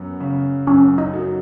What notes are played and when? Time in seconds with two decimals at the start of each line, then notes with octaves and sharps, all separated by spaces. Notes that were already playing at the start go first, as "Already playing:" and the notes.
Already playing: F#2 B3
0.20 C#3
0.67 F#2 C#4
0.98 D#4
1.14 F#3